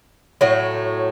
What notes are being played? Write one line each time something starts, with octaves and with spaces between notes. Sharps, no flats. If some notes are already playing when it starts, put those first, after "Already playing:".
A2 F#3 A3